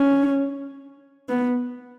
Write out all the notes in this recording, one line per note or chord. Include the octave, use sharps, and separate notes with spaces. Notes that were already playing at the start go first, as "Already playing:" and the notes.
Already playing: C#4
B3